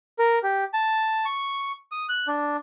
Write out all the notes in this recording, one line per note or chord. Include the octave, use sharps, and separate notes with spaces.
A#4
G4
A5
C#6
D#6
F#6
D4